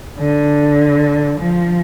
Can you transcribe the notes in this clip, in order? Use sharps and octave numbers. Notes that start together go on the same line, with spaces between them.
D3
F3